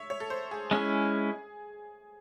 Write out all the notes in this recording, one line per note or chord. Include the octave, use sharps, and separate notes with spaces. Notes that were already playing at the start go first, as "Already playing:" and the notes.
Already playing: C#5 E5
C#5
A4
C5
G#4
G#3 C#4 E4 G#4